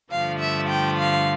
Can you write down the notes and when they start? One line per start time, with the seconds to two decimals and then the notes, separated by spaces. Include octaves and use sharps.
0.11 G2 D3 F3 A3 F5
0.40 E5
0.69 G5
0.98 F5